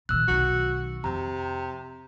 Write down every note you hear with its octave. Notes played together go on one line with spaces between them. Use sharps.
A#2 D#3 E6 F#6
B1 D#3 F#4
F2 C3 A#5